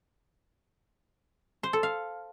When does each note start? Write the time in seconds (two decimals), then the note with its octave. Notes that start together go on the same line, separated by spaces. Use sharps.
1.63 C5
1.73 A4
1.83 F5